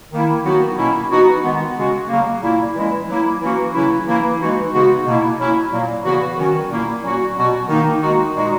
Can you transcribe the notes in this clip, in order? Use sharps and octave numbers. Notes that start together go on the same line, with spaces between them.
D#3 A#3 E4
D#3 F#3 B3 D#4 F#4
B2 A#3 C#4 E4
E3 B3 D#4 F#4
D#3 G#3 B3
C#3 G#3 C#4 F#4
C#3 F#3 A#3
A#2 A#3 E4
E3 G#3 C#4 E4
F#3 A#3 E4
E3 A#3 C#4 F#4
C#3 F#3 C#4 E4
E3 A#3 E4
E3 G#3 D#4 F#4
C#3 G#3 B3 D#4 F#4
B2 A#3 E4
F#3 C#4 E4
A#2 F#3 A#3
C#3 E3 B3 F#4
D#3 F#3 C#4 F#4
A#2 A#3 E4
A#2 F#3 C#4 F#4
B2 F#3 B3 F#4
D#3 A#3 D#4
D#3 G#3 D#4 F#4
A#2 G#3 D#4 F#4